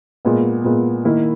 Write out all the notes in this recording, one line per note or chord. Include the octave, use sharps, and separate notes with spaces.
A#2 G#3 B3
A#2 G#3 B3
D#3 A#3 E4